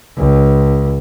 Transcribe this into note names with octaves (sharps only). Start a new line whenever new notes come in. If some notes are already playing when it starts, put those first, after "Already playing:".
C#2